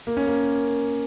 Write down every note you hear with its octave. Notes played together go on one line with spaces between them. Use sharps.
A#3
C#4
A#3